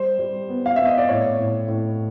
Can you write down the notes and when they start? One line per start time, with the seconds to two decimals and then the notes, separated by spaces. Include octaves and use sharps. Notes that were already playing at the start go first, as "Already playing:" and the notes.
Already playing: G3 C5
0.19 G3
0.49 B3
0.66 F5
0.76 B3 E5
0.87 D#5
0.98 D5
1.08 A2 C#5
1.38 A2
1.68 A2